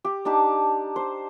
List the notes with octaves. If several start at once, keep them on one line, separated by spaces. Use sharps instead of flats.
G4
D4 D#4 G4 A5
C5